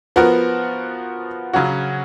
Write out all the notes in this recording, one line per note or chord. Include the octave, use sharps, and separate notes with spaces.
F3 B3 F#4 A#4
C#3 F#3 C#4 F#4